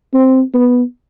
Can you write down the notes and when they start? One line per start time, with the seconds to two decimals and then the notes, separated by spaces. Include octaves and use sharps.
0.14 C4
0.54 B3